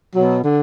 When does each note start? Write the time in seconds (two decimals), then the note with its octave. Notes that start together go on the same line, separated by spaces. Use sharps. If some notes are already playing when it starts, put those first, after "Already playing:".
0.15 B2 F#3
0.44 D3